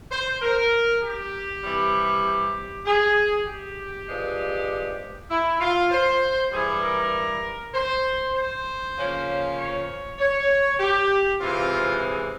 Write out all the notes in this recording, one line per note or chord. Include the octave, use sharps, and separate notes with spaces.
C5
A#4
G4
C3 E3 G3
G4
G#4
G4
G2 F3 G#3
E4
F4
C5
G2 E3 G3 G#4
A#4
C5
C5
C#3 F3 A#3 C#4
C#5
C#5
G4
C3 E3 G#3 C4 F4
G#4